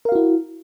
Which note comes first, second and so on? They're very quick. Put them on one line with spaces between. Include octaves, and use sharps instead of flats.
A#4 F5 F#4 E4